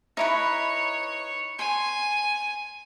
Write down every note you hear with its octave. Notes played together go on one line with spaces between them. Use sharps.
D#4 E4 B4 C#5
G#5 C6